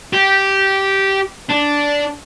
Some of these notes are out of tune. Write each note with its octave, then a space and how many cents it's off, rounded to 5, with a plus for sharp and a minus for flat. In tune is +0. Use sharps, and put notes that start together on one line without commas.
G4 -10
D4 -10